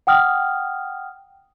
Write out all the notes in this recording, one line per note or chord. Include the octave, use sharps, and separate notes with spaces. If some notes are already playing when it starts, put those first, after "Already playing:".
F#5 G5 D#6 F6